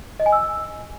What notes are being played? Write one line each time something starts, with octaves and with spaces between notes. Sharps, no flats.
D#5
G#5
E6